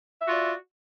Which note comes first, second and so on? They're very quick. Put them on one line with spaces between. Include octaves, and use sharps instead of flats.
E5 F#4 F4 D5